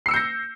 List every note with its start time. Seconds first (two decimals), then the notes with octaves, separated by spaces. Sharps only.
0.06 C7
0.08 E6
0.11 C#7
0.14 G6
0.16 A#6